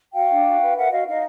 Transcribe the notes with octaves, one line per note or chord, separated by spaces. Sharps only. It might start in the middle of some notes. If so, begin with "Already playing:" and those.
F#4 F5 G5
D4
F#4
B4
A#4 E5 F#5
F#4 D#5 F5
D#4 D#5 F5